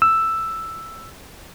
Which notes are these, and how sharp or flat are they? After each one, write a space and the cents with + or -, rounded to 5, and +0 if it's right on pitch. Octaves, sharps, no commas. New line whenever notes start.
E6 +5